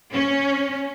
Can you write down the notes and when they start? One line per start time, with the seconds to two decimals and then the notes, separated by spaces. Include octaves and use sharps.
0.13 C#4